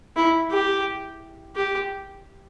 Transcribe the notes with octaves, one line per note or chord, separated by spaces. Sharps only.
E4
G4
G4